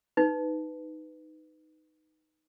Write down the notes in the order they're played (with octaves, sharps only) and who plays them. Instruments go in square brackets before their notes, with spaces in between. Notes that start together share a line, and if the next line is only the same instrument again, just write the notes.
[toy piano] D#4 B4